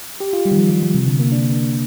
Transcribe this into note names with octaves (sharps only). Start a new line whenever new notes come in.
G4
F4
G3
D#3
F3
G3
G3
C3
D3
A#3
D4